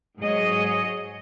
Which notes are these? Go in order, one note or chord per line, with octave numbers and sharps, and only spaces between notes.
G#2 F#3 G#4 C#5 D#5